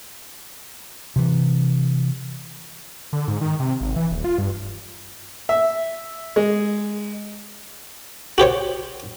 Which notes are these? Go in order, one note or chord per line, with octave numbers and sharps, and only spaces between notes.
C3 E3
D3
G#2
D#3
C3
G#1
E3
D#1
F4
G2
E5
G#3
F#4 G4 C5 C#5